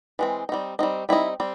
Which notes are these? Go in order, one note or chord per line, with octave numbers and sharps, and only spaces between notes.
E3 G#3 C4
G3 C4 D#4
G3 C4 D#4
G3 C4 D#4 E4
G3 C4